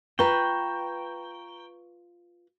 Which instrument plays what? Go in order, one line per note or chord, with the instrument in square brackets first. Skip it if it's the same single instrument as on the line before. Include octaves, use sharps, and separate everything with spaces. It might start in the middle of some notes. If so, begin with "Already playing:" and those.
[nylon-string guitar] F4 B4 [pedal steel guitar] G5 [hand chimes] A#5 C#6